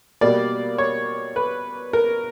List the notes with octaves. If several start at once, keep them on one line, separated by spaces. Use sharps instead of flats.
B2 G3 A#3 D5
C#5
B4
A#4